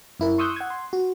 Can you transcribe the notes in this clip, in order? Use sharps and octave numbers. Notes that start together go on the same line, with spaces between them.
F#2 E4 A#4
C6 C#6 D#6 E6 F#6 G6
F#5 G#6
C6
F#4